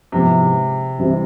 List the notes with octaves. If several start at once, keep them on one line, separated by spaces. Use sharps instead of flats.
G#2 C3 F3 G#3 B3 E4
C2 C3 E3 G3 C4